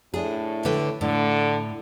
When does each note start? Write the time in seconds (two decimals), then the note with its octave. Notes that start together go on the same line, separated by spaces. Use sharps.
0.14 A2 D4 G#4
0.65 D3 B4 G5
1.01 A2 D3